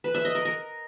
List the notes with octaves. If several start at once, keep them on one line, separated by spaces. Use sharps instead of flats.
B4
E5
D#5
A#4
A#4